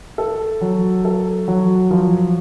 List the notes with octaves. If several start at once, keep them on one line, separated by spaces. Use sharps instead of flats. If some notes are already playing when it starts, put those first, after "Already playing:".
A4
F#3
A4
F#3
F3